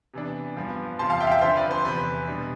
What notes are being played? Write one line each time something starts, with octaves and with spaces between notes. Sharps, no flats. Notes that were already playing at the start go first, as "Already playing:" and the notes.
C3 E3 B3 D4
G2 F3 B3
E2 C3 F3 A5 C6
F5 A5
E5 G5
F5
E5 G5
D3 F3 C4 C5 E5
B4 D5
C5
E2 C3 E3 B4
B2 G3 D4